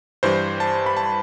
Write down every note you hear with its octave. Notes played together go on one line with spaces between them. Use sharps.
G2 E3 G3 C5
A5
B5
A5